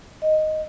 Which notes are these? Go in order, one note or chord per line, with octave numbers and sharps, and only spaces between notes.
D#5